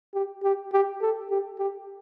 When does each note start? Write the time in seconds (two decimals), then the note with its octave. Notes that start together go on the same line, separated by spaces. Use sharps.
0.14 G4
0.43 G4
0.73 G4
1.02 A4
1.30 G4
1.59 G4